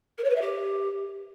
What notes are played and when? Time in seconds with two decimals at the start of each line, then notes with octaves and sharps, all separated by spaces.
0.18 A#4
0.24 C#5
0.30 B4
0.36 E5
0.42 G4